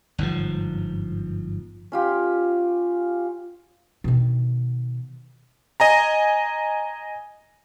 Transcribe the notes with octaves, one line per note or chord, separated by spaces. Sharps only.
G1 G#2 C3 F3
C#4 F4 G4
B2 D#3
D#5 G#5 A#5